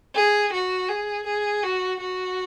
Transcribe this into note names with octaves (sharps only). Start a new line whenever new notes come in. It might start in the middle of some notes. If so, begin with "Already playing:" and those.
G#4
F#4
G#4
G#4
F#4
F#4